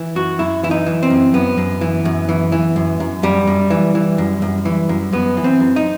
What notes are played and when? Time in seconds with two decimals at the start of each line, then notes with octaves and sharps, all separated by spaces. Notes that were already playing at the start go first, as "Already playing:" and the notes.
Already playing: E3
0.15 F#2 F#4
0.39 F#2 E4
0.63 E3 E4
0.71 D#4
0.86 E3
1.03 C4
1.10 F#2
1.34 F#2 B3
1.58 F#2
1.81 E3
2.05 F#2
2.29 E3
2.52 E3
2.76 F#2
3.00 F#2
3.23 F#2 G3
3.47 F#2
3.70 E3
3.95 E3
4.18 F#2
4.42 F#2
4.65 E3
4.89 F#2
5.13 F#2 B3
5.37 E3
5.44 C4
5.60 F#2
5.76 D#4